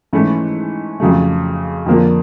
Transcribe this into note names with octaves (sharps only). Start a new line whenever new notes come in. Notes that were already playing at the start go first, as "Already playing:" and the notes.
G#2 E3 A3 C#4 E4
F2 C#3 F#3 A3
F2 D3 F3 A#3 D4